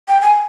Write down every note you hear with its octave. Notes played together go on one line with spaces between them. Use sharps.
G5
G#5